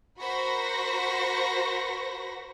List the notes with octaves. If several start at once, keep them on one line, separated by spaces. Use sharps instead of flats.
F#4 A#4 C5 B5 C#6 A#6